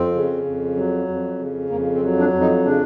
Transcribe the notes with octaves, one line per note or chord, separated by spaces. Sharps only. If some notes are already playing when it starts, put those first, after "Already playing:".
Already playing: F2 C4
C#3
F2
F#3
F2
C#3
F2 A#3
C4
F#3
D4
F2
D#4
C#3 D4